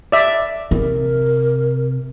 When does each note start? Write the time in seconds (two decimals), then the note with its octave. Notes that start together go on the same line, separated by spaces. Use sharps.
0.12 D5 E5
0.71 C3 A#4